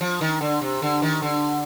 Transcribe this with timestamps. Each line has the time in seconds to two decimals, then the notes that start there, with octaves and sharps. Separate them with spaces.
0.01 F3
0.21 D#3
0.41 D3
0.61 C3
0.82 D3
1.02 D#3
1.22 D3